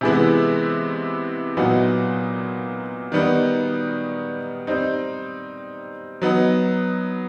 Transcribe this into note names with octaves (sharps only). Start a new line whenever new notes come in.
C3 E3 G#3 B3 E4
A#2 F#3 B3 D#4 F#4
D#3 G3 B3 D#4
G3 C4 D#4
F#3 B3 D#4